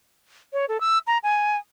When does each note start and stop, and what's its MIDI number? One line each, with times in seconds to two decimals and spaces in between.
0.53 0.66 73
0.69 0.80 69
0.81 0.99 88
1.07 1.18 82
1.23 1.57 80